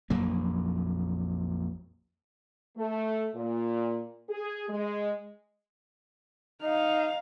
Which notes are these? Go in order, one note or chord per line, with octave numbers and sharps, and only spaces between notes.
A#1 F2 F#3 A#3
A3
A#2
G#4
G#3
D#4 D#5 F5